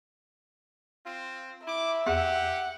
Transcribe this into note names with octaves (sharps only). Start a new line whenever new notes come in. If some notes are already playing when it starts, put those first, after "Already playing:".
C4 F4
E4 E5 D6
E2 G4 F#5